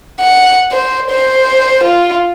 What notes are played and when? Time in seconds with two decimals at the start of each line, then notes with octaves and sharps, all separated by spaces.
0.20 F#5
0.71 C5
1.10 C5
1.84 F4